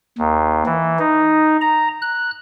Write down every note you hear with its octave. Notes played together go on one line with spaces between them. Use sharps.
D#2
E3
D#4
A#5
F#6